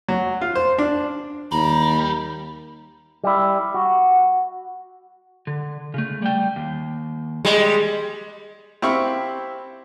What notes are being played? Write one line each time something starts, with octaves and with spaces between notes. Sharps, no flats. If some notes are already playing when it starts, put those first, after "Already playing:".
F#3
F4
C5
D4
D#2 G3 A#5
G3 E4
F#4
D3
C#3 A3
G3 G5
D#2
G3 G#3
C4 E4 G4 F5 B5 C#6